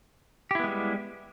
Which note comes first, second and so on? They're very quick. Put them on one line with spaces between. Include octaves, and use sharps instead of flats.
G4 E4 B3 G#3 G3